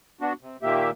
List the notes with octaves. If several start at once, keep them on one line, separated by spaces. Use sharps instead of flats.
B3 D4 F#4
C3
A#2 D#3 A#3 G4 E5